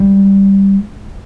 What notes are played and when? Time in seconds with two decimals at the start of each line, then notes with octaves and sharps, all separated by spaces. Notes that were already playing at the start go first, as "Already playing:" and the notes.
Already playing: G3